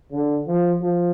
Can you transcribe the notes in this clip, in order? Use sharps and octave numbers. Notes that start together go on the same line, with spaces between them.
D3
F3
F3